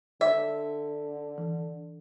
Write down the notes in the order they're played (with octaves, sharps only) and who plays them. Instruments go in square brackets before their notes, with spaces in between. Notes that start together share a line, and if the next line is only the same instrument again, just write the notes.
[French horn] D3 [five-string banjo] E5
[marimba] E3